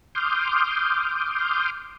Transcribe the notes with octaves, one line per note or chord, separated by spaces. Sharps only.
C6 D6 D#6 F6 G6